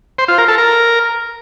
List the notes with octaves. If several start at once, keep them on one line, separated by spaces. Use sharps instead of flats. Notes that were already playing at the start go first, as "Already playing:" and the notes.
C5
F4
A#4
A4
A#4